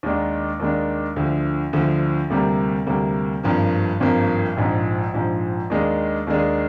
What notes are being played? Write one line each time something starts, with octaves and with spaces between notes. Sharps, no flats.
D#2 D#3 G#3 D4
D#2 D#3 G#3 D4
D2 D3 F3
D2 D3 F3
D2 C3 G3 A#3
D2 C3 G3 A#3
G#1 G2 F3 A#3
G#1 G2 F3 A#3
A#1 G#2 F3
A#1 G#2 F3
D#2 D#3 G#3 D4 G#4
D#2 D#3 G#3 D4 G#4